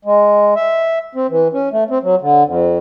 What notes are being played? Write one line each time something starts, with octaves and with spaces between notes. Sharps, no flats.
G#3
E5
C4
E3
C#4
A3
C4
F#3
D3
F2